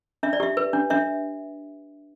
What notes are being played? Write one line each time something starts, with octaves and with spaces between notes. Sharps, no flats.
D4 E5
D5
G4 E5
B4
D4
D4 E5